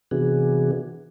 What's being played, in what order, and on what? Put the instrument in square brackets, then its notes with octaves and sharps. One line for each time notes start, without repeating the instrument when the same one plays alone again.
[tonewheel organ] C3 E3 B3 D4 F#4 G#4